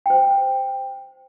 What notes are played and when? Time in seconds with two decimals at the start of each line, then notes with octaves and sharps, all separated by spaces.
0.06 C5 G5